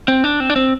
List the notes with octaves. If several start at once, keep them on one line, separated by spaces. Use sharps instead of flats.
C4
D4
C4
D4
C4